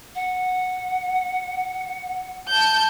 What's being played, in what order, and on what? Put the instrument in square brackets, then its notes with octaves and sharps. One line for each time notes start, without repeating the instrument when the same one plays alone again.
[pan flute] F#5
[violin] A5 G6